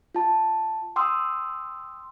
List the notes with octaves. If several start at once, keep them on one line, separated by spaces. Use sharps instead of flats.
F4 A5
G5 C6 D#6 E6